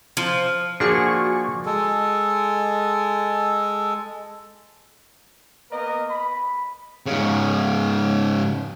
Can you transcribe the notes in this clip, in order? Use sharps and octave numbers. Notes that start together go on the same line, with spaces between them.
F3
F3 A#3 D4 F#4 G#4 C#6
G#3 A4
A#3 B3 A#4 B4 D#5
B5
G#2 C#3